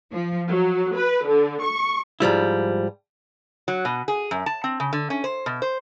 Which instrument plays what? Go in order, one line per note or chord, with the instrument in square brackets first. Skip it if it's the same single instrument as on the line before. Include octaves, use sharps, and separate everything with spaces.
[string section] F3
F#3
B4
D3
C#6
[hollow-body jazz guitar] G#2 F3 G3 E4
[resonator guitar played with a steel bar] F#3
B2
G#4
F#2
A5
C4
C#3
D3
C#4
C5
B2
C5